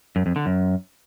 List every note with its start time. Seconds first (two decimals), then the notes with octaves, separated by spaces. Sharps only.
0.16 F#2
0.26 F2
0.36 D3
0.46 F#2